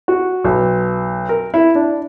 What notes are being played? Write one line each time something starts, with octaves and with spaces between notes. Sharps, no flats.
F#4
B1
A#4
E4
D4